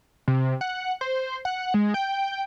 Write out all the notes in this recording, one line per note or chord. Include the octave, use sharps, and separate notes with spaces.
C3
F#5
C5
F#5
G#3
G5